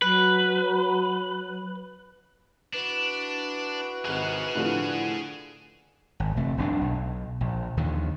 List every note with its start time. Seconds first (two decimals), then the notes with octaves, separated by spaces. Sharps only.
0.02 F#3 B4
2.73 E3 D4 F#4 B4
4.05 G#1 G#4 F5 F#6
4.55 A2 D3 F3
6.20 G#1
6.36 E1 C3 A3
6.57 E1 B1 C3 D4
6.81 B1
7.41 A#1
7.77 D#2 D3 D#3 F3